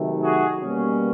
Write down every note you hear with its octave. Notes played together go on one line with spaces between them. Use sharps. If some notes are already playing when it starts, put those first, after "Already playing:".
Already playing: C3 D#3 F#3 A3
F#4 G#4
B2 G3 A#3 C#4